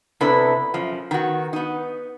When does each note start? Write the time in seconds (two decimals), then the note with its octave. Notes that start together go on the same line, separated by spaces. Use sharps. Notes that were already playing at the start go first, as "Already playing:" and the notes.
0.21 C3 B3 D4 E4 A4 B4
0.74 F#2 F3
1.11 D#3 B3 F#4
1.53 B3 D#4